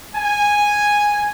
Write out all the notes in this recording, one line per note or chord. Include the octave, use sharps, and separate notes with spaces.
G#5